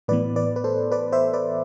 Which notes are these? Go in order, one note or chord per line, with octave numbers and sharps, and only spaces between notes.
A2 E3 B3 B4 D5
B4 D5
B4
A4 C5
B4 D5
C5 E5
B4 D5